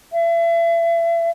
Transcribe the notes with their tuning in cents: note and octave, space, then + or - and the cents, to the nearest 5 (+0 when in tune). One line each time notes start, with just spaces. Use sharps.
E5 +35